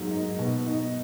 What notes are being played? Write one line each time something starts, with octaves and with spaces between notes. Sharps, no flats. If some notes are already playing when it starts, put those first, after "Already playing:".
Already playing: G#2 F#3 A#3
D#4
B2
D#4